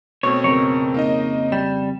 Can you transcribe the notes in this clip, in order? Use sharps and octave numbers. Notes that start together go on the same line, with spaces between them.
B2 A3 C4 C#5
F2 C#3 A#4 C#5
A#3 D#4 D#5
G3 E7